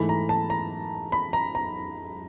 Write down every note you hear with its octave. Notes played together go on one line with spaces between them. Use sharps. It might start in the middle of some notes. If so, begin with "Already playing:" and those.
Already playing: G#2 E3 A3 B5
A#5
A5
A#5
B5
A#5
A#5